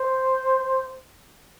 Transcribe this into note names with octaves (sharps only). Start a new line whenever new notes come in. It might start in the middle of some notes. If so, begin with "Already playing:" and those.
Already playing: C5